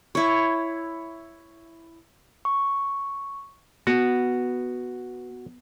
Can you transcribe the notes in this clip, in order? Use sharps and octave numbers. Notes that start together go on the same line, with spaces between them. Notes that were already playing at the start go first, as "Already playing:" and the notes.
E4 C#5
C#6
B3 F#4